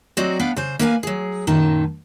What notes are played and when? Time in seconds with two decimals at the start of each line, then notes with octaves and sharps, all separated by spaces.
0.17 F#3 C4 F#4 D5 D#5
0.39 B3 D4 F5 G5
0.57 C#3 C5
0.79 A#3 A#4 B4 F5 G5 G#5
1.03 F#3 G#4
1.47 F#2 A#2 D#3 A5